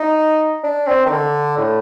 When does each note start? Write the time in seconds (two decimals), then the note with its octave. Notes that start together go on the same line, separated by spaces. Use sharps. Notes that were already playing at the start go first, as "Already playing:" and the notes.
Already playing: D#4
0.64 D4
0.87 C4
1.06 D#3
1.11 D3
1.57 A2